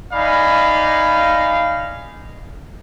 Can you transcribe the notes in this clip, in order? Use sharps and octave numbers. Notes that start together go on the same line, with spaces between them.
D#4 D5 F5 G#5 B5